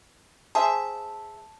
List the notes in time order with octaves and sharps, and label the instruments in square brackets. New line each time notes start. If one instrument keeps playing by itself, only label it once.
[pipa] G#4 C5 E5 [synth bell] A5